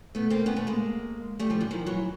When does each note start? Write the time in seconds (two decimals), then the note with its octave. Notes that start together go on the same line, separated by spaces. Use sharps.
0.15 A3 B3
0.30 A#3 C4
0.46 B3 C#4
0.56 A3 B3
0.67 G#3 A#3
1.39 G3 A3
1.50 F3 G3
1.61 E3 F#3
1.71 D#3 F3
1.86 E3 F#3